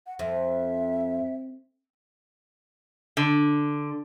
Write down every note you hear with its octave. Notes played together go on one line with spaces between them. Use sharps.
F#5
F2 E5
D3